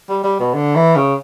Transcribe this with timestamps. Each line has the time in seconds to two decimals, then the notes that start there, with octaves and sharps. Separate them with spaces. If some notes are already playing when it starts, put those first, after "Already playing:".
0.09 G3
0.24 G3
0.40 B2
0.54 D3
0.75 E3
0.96 C#3